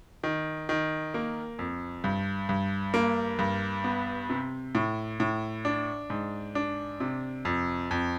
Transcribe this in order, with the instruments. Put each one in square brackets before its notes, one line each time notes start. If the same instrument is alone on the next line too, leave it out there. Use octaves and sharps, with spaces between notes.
[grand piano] D#3
D#3
A#3
F2
G2
G2
A#3
G2
B3
C3
A2
A2
D4
G#2
D4
C3
F2
F2